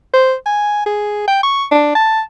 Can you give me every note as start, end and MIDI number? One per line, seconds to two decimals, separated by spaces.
0.14 0.34 72
0.46 0.83 80
0.86 1.25 68
1.28 1.42 79
1.43 1.64 85
1.71 1.91 62
1.95 2.21 81